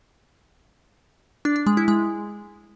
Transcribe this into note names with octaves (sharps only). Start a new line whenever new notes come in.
D4
D4
G#3
E4
G#3